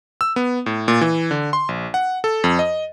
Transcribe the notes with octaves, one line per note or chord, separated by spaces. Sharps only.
E6
B3
A2
A#2
E3
D3
C6
A#1
F#5
A4
F2
D#5